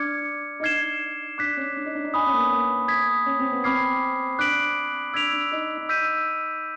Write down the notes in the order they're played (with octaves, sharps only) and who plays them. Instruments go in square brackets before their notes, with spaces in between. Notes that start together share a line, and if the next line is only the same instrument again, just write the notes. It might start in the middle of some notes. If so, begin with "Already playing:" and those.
Already playing: [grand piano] D4 [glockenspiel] D6 F6 G#6 C#7
[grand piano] D#4
[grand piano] D4 [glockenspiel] F6 G#6 C7 E7 G7
[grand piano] D4 [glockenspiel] D6 F#6 B6
[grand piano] C#4
D4
D#4
D4
D#4
[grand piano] D4 [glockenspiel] G#5 B5 D#6
[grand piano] C#4
A#3
B3
A#3
[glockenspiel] D#6 G#6 B6
[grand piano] C#4
C4
B3
[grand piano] C4 [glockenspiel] B5 D6 F6 G#6 C7
[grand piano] D4 [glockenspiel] D6 F#6 B6 D7 F#7
[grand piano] D4 [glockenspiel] E6 G#6 B6 D7 F7
[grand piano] D4
D#4
D#4
[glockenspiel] E6 G6 B6 D#7